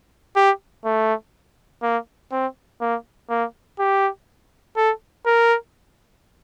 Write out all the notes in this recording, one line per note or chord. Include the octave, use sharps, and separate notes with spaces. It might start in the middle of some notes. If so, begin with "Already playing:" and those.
G4
A3
A#3
C4
A#3
A#3
G4
A4
A#4